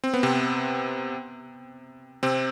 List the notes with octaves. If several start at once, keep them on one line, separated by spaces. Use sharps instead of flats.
C4
B3
C3 C4
C3 C4